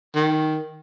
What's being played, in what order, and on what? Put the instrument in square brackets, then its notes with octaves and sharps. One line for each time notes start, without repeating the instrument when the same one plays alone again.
[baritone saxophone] D#3